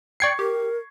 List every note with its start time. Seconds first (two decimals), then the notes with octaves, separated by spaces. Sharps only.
0.20 D5 G5 C#6 G#6 C7 C#7
0.39 G4 A#4